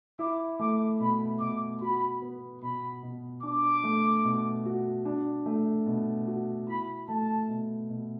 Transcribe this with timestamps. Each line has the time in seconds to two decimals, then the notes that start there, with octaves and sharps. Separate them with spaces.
0.19 E4 D6
0.59 A3 D6
1.00 B2 B5
1.40 B2 D6
1.81 F#4 B5
2.22 B3
2.62 B2 B5
3.03 B2
3.43 D4 D6
3.84 A3
4.24 B2
4.65 F#4
5.05 D4
5.46 A3
5.86 B2
6.27 F#4
6.68 E4 B5
7.08 A3 A5
7.49 B2
7.89 B2